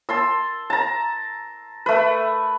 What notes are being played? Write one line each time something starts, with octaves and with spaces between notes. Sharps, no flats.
A5 C6 E6
A5 A#5
A3 B4